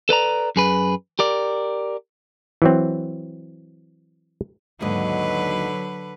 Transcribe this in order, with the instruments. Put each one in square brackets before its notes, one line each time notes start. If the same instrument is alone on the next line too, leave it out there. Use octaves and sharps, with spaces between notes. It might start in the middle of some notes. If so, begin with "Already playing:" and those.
[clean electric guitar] A4 B4 D5 A#5
F#2 G#4 B4
G4 A#4 D5
[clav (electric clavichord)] E3 F#3 C4
[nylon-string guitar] D#2 G#2 D#5 [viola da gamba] D3 B4 [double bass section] F#3